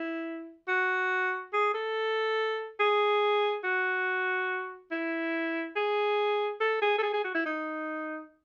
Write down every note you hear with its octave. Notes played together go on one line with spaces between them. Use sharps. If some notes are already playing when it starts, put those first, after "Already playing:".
Already playing: E4
F#4
G#4
A4
G#4
F#4
E4
G#4
A4
G#4
A4
G#4
G#4
F#4
E4
D#4